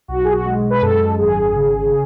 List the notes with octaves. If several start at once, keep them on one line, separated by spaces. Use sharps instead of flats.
B1 F#4
G#4
F#4
G#3
B4
F#2 A4
G#1 G#4
C#3